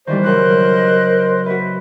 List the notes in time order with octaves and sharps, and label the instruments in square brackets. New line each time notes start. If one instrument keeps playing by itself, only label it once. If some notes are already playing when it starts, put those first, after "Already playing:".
[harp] D#3 E3 G3 [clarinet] C5 [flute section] D5
[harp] C#3 F#3 [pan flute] A#4 [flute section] D#5 C6 F#6
[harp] F#4 B4 [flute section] E5